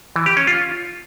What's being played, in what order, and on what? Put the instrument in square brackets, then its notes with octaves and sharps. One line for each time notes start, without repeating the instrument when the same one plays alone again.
[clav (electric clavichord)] E3
G4
C#4
F4